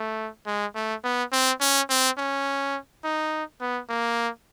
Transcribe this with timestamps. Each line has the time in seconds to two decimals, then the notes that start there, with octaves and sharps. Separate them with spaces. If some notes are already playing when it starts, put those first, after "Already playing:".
Already playing: A3
0.46 G#3
0.75 A3
1.04 B3
1.32 C4
1.61 C#4
1.89 C4
2.18 C#4
3.04 D#4
3.61 B3
3.89 A#3